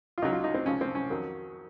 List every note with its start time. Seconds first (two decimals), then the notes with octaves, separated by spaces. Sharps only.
0.18 F4
0.22 C#2 C#3 F#3 D#4
0.33 F4
0.44 D#4
0.54 C4
0.66 C#2 C#3 F3 C#4
0.81 C4
0.95 C#4
1.10 F2 D#3 F#3